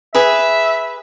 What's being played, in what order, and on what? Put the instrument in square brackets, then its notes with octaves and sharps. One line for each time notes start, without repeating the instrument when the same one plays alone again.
[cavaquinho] G#4 B4 [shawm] E5